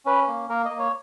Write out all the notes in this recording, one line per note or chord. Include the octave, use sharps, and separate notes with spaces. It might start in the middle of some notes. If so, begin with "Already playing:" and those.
C#4 B4
A#3
A#3 A#4
A#3 D#5
C#5